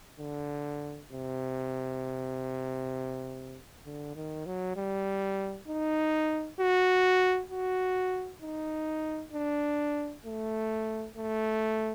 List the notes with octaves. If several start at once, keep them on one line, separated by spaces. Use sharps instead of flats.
D3
C3
D3
D#3
F#3
G3
D#4
F#4
F#4
D#4
D4
A3
A3